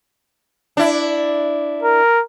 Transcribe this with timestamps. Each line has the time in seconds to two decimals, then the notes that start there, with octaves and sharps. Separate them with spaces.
0.77 D4 E4
1.82 A#4